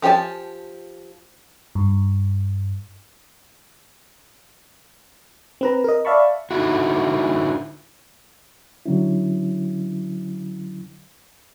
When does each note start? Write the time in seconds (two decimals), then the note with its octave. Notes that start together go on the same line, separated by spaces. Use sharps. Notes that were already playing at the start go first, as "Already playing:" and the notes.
0.02 F3 G4 A4 G#5 A5
1.75 G2
5.61 C4 B4 A#5
5.84 A#4 D#5
6.05 D5 E5 F5 A5 B5 C#6
6.51 D3 D#4 E4 F#4
8.86 D3 F#3 C#4 E4